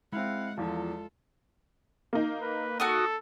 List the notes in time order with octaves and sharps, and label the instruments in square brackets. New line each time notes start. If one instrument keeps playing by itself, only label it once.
[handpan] G#3 [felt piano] C4 E4 [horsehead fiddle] F5 F#5
[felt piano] E2 F3 [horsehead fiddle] F4 A4
[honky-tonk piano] A#3 D#4
[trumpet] B4
[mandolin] F#4 C#6 D#6 [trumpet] A4